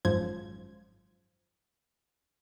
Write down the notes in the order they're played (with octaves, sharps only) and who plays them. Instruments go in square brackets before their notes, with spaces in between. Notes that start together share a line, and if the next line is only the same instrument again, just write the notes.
[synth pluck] G#1 F#2 F3 C5 G#6